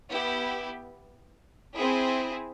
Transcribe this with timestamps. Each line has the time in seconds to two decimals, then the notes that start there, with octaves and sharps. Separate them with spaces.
0.10 B3 E4 G4
1.75 C4 E4 G#4